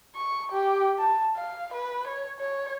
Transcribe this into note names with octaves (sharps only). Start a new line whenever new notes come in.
C#6
G4
A5
F5
B4
C#5
C#5